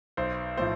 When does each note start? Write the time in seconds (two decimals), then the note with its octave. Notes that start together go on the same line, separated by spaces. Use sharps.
0.17 B1 C5
0.57 A2 F3 C5